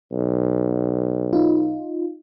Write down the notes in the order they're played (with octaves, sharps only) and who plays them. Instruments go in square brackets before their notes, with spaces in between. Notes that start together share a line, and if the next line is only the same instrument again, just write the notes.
[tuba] B1
[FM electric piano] D#4 F4